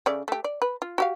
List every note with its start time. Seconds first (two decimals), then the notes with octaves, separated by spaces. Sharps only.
0.06 C#3 A3 D5
0.28 A3 G4
0.44 D5
0.62 B4
0.82 F4
0.98 F#4 G4 F5